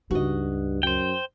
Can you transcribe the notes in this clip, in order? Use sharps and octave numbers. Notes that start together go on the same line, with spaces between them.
C#2 G2 D#4 F#4 D#5
F#2 C5 G5